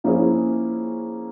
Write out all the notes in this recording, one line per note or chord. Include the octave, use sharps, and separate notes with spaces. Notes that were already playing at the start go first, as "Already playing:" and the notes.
F3 A#3 C#4 E4 G#4